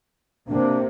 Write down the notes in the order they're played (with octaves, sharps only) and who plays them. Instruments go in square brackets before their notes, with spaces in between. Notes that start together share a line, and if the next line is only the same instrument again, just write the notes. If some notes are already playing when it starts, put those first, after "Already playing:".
[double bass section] C3 A#3 [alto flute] D4